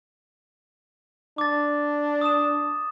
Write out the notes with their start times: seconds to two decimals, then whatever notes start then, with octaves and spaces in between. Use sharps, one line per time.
1.38 D4 D6 A6
2.21 D#6 E7